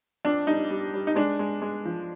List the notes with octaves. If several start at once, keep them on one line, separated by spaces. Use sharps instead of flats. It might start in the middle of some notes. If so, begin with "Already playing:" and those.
F2 D4
G3 D#4
G3
G3
D#4
G#3 D4
G#3
G#3
F3